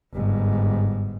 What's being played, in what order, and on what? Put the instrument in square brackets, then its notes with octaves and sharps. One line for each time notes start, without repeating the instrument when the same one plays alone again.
[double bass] G1 G#2